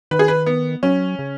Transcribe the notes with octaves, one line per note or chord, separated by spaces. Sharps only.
D#3 B4
G#4
B4
B3
F#3 C#4
C#3